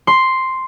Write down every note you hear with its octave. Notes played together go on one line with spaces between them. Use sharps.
C6